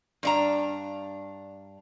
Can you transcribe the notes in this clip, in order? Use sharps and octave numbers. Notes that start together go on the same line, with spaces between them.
G2 D4 A#5